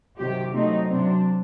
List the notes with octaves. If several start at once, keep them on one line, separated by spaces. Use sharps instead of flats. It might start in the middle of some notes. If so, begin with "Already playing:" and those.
C3 D#3 F#3 G4
C3 F#3 A3 C4 D#4
C3 F#3 C4 D4